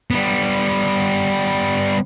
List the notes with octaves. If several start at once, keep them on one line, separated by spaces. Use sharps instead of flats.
G3 B3